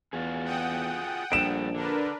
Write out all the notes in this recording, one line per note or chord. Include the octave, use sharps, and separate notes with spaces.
E2 F4 F#4 G#4
F#5 G5 D#6
A#1 D3 G3 D7 E7
D3 D4 A#4 B4